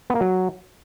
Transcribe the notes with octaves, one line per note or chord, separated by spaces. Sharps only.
B3
A#3
F#3